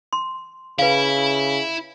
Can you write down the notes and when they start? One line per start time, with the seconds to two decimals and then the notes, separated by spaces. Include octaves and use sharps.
0.13 C6
0.79 C#3 E4 B4 F5